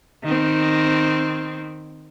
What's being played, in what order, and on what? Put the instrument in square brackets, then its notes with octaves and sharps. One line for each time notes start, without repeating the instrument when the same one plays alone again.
[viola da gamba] D#3 C4